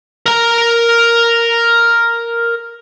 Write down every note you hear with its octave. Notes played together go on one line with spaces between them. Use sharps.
A#4 A#5